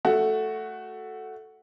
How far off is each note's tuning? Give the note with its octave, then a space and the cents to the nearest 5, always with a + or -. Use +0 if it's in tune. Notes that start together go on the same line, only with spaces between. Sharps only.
A3 -5 F#4 +0